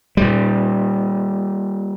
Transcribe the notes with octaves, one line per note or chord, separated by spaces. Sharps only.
A#2 G3